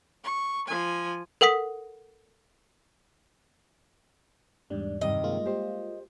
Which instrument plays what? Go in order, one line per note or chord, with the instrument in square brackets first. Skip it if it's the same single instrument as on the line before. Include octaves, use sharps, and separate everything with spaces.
[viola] C#6
F3 G#5
[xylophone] A4 A#4 F#5 D#6 B6
[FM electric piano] E2 G#2 G3 [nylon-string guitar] D4
[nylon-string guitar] G2 C3 D#3 [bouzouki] D#5
[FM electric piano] G#3 A#3 F4
[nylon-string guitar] G4 C5